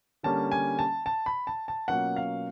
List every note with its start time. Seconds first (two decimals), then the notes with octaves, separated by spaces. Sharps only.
0.23 D3 G3 A#3 C#4 A5
0.52 G#5
0.79 A5
1.06 A5
1.26 B5
1.47 A5
1.68 A5
1.88 B2 F#3 A#3 C#4 F4 F#5
2.16 F5